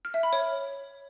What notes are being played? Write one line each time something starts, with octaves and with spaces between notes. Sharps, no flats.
F6
E5
B5
C#5